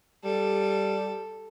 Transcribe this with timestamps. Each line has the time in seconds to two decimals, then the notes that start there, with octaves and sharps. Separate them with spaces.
0.24 G3 A4